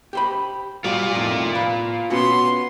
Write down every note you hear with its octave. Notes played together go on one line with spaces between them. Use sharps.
G4 C5 B5
G3 F4 F#4 C5 D5
F2 A2 D#3
B4
B2 B3 C#4 F#4 C6